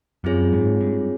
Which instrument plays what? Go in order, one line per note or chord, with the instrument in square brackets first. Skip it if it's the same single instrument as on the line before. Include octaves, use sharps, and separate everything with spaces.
[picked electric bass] F#2 [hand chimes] C4 F4 G#4 C#5
[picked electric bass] G#2
G2